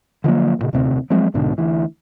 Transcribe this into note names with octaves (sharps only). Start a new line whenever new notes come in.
D3 F3 F#3 A#3
A1 A#2 C#3
D#1 D2 C3 C4
F3 F#3 G#3 C4
C2 G#2 B2 D3
D2 E3